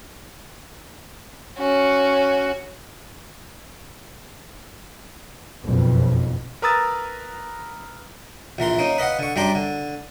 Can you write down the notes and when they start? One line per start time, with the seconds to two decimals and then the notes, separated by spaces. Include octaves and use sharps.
1.59 C#4 F#4
5.63 F#1 B1 F2 B2
6.62 A#4 B4 A#5 D#6 E6 A6
8.59 A#1 E3 A#4 C6
8.78 A#3 C#4 D#4
8.98 B4 D#5 F5 F#5
9.19 D3 C#6
9.36 F#2 G3 D4 A#5 C6 D6
9.55 D3